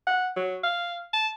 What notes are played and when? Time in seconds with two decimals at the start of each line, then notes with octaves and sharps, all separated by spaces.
0.07 F#5
0.36 F#3
0.63 F5
1.13 A5